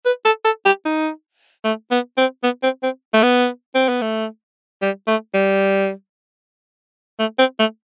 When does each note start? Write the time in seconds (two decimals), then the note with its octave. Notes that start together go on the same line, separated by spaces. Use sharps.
0.05 B4
0.25 A4
0.45 A4
0.65 G4
0.85 D#4
1.64 A3
1.91 B3
2.17 C4
2.44 B3
2.63 C4
2.83 C4
3.14 A3
3.23 B3
3.75 C4
3.89 B3
4.02 A3
4.82 G3
5.07 A3
5.34 G3
7.19 A3
7.39 C4
7.59 A3